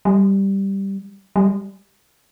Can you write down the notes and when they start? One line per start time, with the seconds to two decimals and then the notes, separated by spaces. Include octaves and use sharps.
0.05 G3
1.36 G3